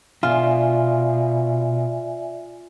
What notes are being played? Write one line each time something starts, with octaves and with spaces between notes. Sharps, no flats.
B2 F4 D5 E5 G#5